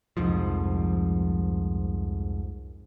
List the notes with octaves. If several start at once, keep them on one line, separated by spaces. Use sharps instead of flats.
C2 F2 G#2 F3